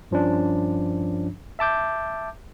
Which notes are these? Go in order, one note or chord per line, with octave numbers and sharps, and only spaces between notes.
G2 F3 C#4 D4
E5 A5 D6 G6